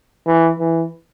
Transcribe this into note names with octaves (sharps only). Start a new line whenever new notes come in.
E3
E3